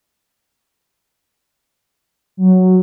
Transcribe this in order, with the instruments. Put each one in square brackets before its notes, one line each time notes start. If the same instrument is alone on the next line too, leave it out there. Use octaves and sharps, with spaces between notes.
[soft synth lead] F#3